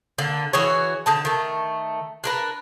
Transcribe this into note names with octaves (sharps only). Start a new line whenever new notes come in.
D3 A#3
E3 F#4 G#4 C#5
D3 D#4 A5
D#3 A3
D4 A#4 B4